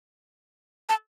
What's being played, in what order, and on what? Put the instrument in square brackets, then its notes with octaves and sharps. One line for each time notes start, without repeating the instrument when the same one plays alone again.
[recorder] A5